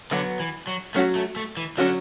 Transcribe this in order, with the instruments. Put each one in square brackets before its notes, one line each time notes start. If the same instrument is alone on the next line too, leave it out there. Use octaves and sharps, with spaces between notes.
[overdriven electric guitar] D3 [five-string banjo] F#3 B3 F#4
[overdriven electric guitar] E3
F#3
[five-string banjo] F#3 C#4 F#4 [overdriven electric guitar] A3
[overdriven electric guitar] A3
A3
E3
[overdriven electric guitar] D3 [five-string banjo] F#3 C#4 F#4